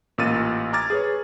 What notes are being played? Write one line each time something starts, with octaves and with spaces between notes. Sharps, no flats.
A1 A#2 E6 F6 A6 D#7
A#5 D6 F6 G#6 A6
G#4 B4 C#5